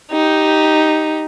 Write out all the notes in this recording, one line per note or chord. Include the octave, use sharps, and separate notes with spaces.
D#4 G4